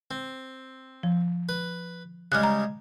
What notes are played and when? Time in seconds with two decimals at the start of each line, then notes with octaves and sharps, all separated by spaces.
0.11 C4
1.03 F3
1.49 B4
2.32 C#3 G3 G#3 F6 F#6
2.43 A#5